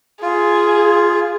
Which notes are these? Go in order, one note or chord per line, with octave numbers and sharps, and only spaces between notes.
F4 G#4